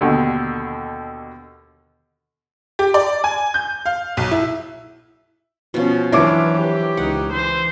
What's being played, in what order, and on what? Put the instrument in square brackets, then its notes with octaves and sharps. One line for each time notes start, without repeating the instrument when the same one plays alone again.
[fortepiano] D#2 B2 D3
[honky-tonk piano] G4
D5
G#5
G6
F5
B1
E4
[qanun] B2 F3 [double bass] C#4
[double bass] E3 F#3 [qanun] D4 A#4 C5 [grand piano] E4 C#5 D6
[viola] G4
[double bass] C#2 D#4 [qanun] F#5
[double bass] E3 [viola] C5